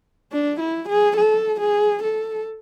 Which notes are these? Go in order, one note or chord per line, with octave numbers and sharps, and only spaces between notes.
D4
E4
G#4
A4
G#4
A4